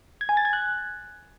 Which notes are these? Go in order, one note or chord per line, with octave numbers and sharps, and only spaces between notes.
G#6
G#5
A6
G#6
F#6